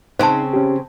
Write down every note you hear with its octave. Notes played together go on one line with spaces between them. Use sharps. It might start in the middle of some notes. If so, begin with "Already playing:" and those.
C#3 C4 D#4 C5 A5
C#4 G4